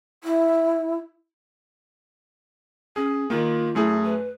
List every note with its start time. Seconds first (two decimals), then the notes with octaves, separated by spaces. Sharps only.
0.24 E4
2.96 C#4 G#4
3.30 D#3 A#3 F4
3.75 F#2 A3 E4 G#4
4.05 B4